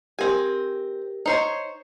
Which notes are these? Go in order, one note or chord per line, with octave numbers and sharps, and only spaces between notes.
C4 G4 A#4 G#5 A#6
D#4 C5 C#5